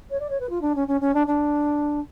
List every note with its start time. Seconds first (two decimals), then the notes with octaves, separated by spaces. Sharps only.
0.10 C#5
0.19 D5
0.30 C#5
0.40 B4
0.49 F4
0.61 D4
0.75 C#4
0.87 C#4
1.00 C#4
1.14 D4
1.27 D4